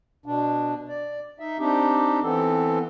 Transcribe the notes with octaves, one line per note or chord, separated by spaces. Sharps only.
B2 D4
D5
D#4 E5
C4 D4 D#4 G4
E3 B3 C4 A4